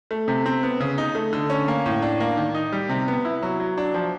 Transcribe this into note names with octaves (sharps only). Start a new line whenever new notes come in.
A3
C3
C4
B3
C#3
D#4
A3
D3
C#4
A#3
A2
D4
A#3
D#3
D#4
G3
C3
B3
E4
F#3
F#3
D4
F3